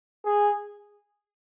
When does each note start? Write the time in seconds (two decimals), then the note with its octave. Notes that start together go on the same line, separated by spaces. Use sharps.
0.25 G#4